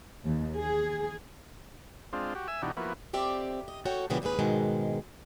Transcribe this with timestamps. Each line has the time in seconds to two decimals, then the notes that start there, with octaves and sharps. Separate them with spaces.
0.24 D#2
0.56 G#4
2.13 G#3 C4 D4 F4
2.35 F#4 G4
2.48 E5 G#5 E6
2.62 B2 E3 D4 D#4 F#4 G4
2.77 F3 A#3 B3 E4 F#4
3.13 F2 C4 G4 D5 E5
3.68 D#5
3.85 F#4 A4 C#5 G5
4.10 A#2 C#3 E3 G3 B3
4.22 D#2 G#2 C#4 G#4 B4
4.39 G#2 B2 D#3 G#3